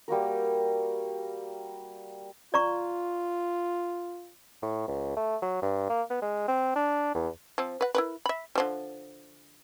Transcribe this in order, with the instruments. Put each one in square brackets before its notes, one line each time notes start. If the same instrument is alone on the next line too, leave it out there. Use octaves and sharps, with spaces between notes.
[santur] G3 A#3 F#4 A#4
[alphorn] F4 [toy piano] D5 A#5 C#6
[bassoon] A2
C#2
A3
F#3
G2
A#3
B3
G#3
C4
D4
E2
[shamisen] F3 C4
B4 F#5
E4 A#4 B4
E5 B5
D3 F3 G3